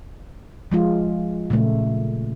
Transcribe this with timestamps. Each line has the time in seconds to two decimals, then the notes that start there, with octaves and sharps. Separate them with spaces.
0.72 F3 G#3 F4
1.50 A#2 C#3 A3